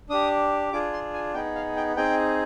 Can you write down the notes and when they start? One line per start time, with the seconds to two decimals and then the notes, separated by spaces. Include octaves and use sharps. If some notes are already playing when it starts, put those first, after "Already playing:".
0.10 D4 G4 D#6
0.72 D4 F4 G#4 D6
0.93 C6
1.14 G#5
1.34 B3 D#4 G#4 G5
1.55 F5
1.76 G5
1.97 C4 D#4 G#4 G5